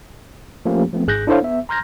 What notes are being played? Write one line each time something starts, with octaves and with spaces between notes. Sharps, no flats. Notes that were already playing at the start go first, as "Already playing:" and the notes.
F3 A3 A#3 C#4 G4
F3 A3 B3 C4
G#1 G#2 G#4 F#6 G6 A#6
D4 E4 A4 C5 C#5 F5
B3 E5
A#5 C6 F6 G6 G#6 A#6